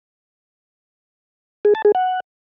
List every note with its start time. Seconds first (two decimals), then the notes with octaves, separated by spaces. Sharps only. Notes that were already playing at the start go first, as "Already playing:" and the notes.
1.65 G#4
1.75 A5
1.85 G#4
1.95 F#5